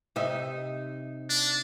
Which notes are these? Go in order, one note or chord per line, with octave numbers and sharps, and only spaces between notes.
C3 D#4 E5
D4